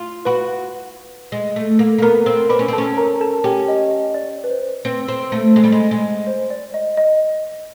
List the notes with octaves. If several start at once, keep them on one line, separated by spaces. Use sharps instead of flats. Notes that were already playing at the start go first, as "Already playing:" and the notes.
Already playing: F4
F#4 B4 B5
G#3
A3
A#3
A#3
B3 A#4 A#5
C4
D4 B4 B5
C#4
C4
A4 A5
C#4
A#4 A#5
A4 A5
C#4 G4 G5
D#5
D#5
D5
B4
C5
C4 B4
C4
A3
G#3
G3
G#3
G#3
C5
D5
D#5
D#5